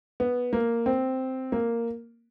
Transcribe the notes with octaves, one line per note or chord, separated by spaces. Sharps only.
B3
A#3
C4
A#3